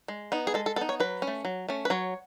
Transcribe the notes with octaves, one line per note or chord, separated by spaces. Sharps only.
G#3
B3 D#4
G#4
G#3 A4
A4
B3 D#4 A4
C#5
F#3 B4
C#4
A3
F#3
A3 C#4
B4
F#3 C#5